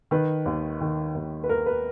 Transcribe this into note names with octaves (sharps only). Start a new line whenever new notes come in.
D#3 B4
D#2
D#3
D#2
B4
D#2 A#4
B4